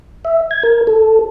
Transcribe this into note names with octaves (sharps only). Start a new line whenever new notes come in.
E5
G#6
A#4
A4